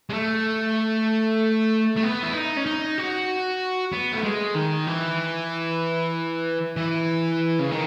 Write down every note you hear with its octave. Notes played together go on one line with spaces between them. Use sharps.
G#3
A3
A3
B3
E4
D#4
C#4
D#4
F#4
B3
A3
G#3
D#3
E3
E3
C#3
D#3